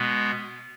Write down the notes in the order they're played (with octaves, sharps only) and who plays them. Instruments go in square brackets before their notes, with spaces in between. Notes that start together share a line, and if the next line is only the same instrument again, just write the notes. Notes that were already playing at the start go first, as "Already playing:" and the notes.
Already playing: [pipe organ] B2 G#3 B3